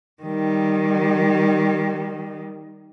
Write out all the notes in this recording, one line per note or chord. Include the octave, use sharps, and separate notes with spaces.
D#3 G3